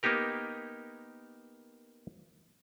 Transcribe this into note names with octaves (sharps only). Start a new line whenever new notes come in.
A#3 B3 D#4 G4 A#4